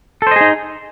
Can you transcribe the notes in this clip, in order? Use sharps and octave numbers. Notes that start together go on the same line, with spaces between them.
D#4 G#4 A4 C5 D#5